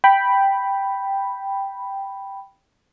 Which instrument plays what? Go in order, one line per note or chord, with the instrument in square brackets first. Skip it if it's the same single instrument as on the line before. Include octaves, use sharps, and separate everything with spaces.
[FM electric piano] G5 B5